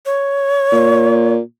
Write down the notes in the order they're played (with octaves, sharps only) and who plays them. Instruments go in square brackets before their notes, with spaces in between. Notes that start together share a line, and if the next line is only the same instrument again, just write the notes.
[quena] C#5
[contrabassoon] A#2